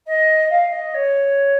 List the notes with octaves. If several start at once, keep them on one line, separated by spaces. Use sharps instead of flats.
D#5
F5
D#5
C#5